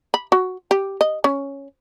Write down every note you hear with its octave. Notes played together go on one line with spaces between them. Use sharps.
B5
F#4
G4
D#5
C#4